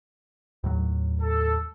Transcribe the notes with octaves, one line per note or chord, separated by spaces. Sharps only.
D#2 A2 F#3
A4